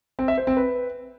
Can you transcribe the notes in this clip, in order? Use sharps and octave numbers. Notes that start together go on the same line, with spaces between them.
C4
E5
C5
C4
B4